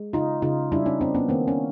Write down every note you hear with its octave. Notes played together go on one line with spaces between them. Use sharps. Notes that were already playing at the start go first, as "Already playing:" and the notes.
Already playing: G#3
C#3 D#4 F4
C#3 D#4 F4
G3 D4 E4
C#4 D#4
A#3 C4 D4
B3 C#4
D#3 A#3 C4
C#4